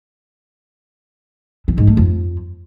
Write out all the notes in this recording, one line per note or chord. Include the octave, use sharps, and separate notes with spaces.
E3
G#2
A3
F2